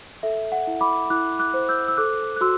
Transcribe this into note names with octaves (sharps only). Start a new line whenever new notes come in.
A4 E5
F#5
E4
B5 D6
E4 D6 F#6
D6 F#6
C5
E6 G6
E6
A4 D6 F#6
F#6
F#4 C6 E6